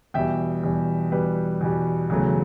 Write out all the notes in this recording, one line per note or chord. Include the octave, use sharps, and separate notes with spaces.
E2 B2 G3 E5 G5
E2 B2 G3
E2 B2 G3 B4
E2 B2 G3
F#1 E2 C#3 F#3 A3